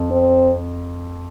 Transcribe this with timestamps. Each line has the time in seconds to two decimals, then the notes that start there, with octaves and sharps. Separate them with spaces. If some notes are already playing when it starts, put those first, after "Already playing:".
Already playing: F2
0.11 C4